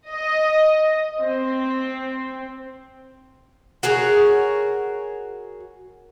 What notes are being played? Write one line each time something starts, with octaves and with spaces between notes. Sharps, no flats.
D#5
C4
F#4 G#4 A#4 C#5